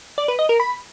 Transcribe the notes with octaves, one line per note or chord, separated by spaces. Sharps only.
D5
B4
D#5
A#4
B5